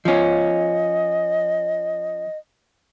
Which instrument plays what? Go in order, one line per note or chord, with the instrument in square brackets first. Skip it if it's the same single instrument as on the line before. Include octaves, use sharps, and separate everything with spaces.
[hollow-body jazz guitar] F3 C#4 [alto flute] D#5